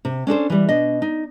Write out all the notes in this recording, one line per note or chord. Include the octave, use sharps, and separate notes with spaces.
C3
C#4 D4 A4 C5
E3 G3
B2 D4 D#5
D#4